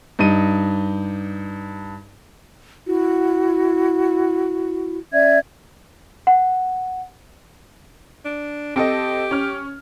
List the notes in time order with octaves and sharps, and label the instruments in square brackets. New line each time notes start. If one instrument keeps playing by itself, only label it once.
[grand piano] G2 D#4 D#7
[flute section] E4 F#4
C#4 D5 E5 G#6
[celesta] F#5
[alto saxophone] D4
[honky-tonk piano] C4 A4 D#5 [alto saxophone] G4
[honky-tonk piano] C#4 F6